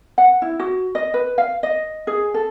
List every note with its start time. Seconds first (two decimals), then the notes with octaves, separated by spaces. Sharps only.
0.18 F#5
0.42 E4
0.59 F#4
0.95 D#5
1.14 B4
1.38 F5
1.63 D#5
2.07 G#4
2.34 A4